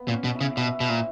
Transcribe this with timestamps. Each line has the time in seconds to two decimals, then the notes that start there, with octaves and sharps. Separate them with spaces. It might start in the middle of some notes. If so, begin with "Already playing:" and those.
Already playing: B3
0.08 A#2
0.13 C#4
0.24 B2
0.35 E4
0.41 C#3
0.57 B2 E4
0.80 B2
0.89 A#2